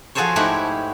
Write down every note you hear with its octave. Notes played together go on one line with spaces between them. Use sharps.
F3 F#4 G#4 A4 C5 C#5
G#2 A3 E4 G4 F#5